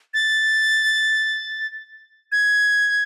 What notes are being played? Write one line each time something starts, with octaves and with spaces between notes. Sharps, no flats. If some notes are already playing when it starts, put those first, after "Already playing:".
A6
G#6